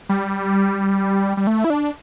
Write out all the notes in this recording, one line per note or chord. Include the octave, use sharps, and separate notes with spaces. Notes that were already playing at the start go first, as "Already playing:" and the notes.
G3
G3
A3
E4
D4